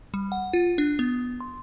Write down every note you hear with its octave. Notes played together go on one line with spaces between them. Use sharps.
G3
F#5
F4
D4
B3
C6